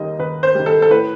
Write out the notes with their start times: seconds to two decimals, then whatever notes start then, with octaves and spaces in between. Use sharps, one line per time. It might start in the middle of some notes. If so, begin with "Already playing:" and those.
Already playing: D#2 D#3 G3 D#5
0.19 D#2 B4
0.43 C5
0.55 D#3 G3
0.66 A4
0.82 A4
0.90 A2 B4